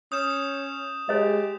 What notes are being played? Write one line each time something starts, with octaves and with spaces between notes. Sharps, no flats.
C#4 D#6 G6 E7
G#3 G4 C#5 D#5